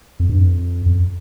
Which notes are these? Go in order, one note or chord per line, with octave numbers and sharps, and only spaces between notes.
F2
G2
F2
F2